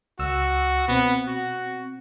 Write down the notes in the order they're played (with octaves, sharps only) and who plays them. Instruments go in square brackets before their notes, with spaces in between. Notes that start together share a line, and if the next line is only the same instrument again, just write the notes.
[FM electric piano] C#2 E6 [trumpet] F#4
[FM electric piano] B2 C4 [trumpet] B3
[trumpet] F#4